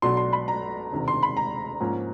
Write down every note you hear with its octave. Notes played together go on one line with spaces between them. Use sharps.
B1 B2 F#3 B3 D4 C6
C6
B5
A#5
E1 D2 C3 D#3
C6
B5
A#5
G#2 F3 A#3 C#4